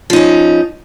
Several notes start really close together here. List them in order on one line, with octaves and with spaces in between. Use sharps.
F3 D#4 C#4